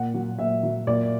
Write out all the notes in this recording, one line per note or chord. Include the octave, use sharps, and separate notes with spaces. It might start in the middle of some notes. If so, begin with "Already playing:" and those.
Already playing: A#2 F#5
F#3
A#2 E5
F#3
A#2 D5